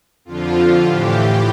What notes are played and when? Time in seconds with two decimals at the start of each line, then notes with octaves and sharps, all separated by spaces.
0.25 F2 D3 F3 F4
0.83 A2 E3 G4